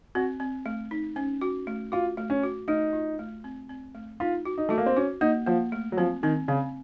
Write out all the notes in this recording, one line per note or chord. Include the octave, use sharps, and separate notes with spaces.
C4 F#4
C4
A3
D#4
C#4
F#4
A3
F4 F#4
A3
C#4
F#4
A3 D#4
F4
A3
C4
C4
A3
D#4 F4
F#4
D#4
A3 F#4
A#3
C4
C#4 F#4
A#3 D#4
F3 A#3
A3
F#3
F3 C4
D#3 C4
C#3 C4